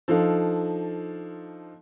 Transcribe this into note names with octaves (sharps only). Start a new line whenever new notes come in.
F3 D4 D#4 A4 F5